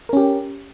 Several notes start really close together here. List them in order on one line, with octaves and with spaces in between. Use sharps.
A#4 C#4 G4